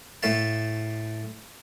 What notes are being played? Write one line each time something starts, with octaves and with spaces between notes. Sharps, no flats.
A2 A3 F5 A5